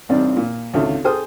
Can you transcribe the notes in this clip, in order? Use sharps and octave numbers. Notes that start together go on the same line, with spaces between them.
A1 G2 C3 C4 D#4 D5
A#2
G#1 C#2 D3 F4 A4 E5
G#4 A4 C5 G5 D#6